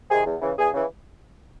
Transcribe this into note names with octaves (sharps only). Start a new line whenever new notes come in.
C3 D#3 G#4
E2
C#3 E3
E2 G#4
C#3 E3